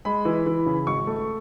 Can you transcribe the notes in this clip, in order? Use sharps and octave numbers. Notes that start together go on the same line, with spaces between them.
G#3 B5
E3
E3
C#3
G#1 C#6
A3